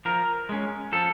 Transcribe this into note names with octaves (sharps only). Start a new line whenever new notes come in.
F3 A#4
G#3 C#4
F3 A4